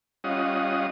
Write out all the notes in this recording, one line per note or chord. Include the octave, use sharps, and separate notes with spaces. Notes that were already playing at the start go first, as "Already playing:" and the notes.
G3 C#4 F4 D#5 F#5 D#6